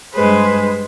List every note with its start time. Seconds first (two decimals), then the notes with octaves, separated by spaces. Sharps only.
0.13 G2 G#3 B4 C5